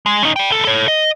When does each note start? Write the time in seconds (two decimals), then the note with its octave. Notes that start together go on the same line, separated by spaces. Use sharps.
0.06 G#3
0.23 C#4 D#4
0.36 D5 G5
0.49 C2 A4
0.65 A4 C#5
0.88 D#5